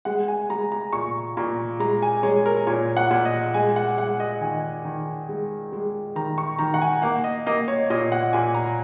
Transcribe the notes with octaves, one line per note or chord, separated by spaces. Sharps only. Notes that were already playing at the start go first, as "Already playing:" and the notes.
G#3 F#5
G#5
G#3 A#5
A#5
A#2 C#6
A#2 A#5
G#3 A#5
G#5
G#3 C#5
A#4
A#2 C#5
F#5
A#2
D#5
G#3 G#5
F#5
G#3 F#5
D#5
D#3 G#5
D#3
G#3
G#3
D#3 A#5
C#6
D#3 A#5
F#5
G#5
A#3 F#5
D#5
A#3 D#5
C#5
A#2 D#5
F#5
A#2 G#5
A#5